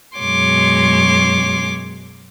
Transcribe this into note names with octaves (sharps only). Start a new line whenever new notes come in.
F#2 B2 G#3 C#5 C6 D6